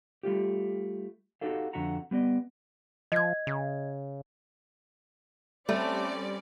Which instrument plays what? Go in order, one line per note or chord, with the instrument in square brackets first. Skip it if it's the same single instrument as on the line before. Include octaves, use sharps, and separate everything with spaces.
[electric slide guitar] G3 A3 F4 G4
D#4 F#4 G4 A4 F5
F2 D3 F#4 E5 F#5 A#5
G3 B3 D5 D#5
[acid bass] F3 [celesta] D#5 G#6
[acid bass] C#3
[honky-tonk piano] G3 [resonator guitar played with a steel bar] A3 [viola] C4 [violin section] C#4 D5